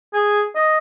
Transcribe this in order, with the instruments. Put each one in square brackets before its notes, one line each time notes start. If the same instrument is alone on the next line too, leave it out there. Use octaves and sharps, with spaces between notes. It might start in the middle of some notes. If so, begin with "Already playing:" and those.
[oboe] G#4
D#5